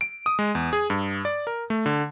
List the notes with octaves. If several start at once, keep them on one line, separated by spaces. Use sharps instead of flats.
D7
D#6
G#3
E2
G#4
G2
D5
A#4
A3
D3